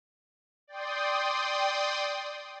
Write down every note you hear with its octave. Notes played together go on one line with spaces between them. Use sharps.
D5 G5 C6 D#6